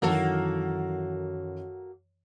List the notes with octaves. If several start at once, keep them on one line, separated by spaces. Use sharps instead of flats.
F#2 D#3 E3 A#3 F#4 A4